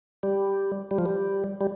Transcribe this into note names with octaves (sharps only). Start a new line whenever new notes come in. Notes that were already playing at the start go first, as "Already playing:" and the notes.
G3
G3
F3
G3
G3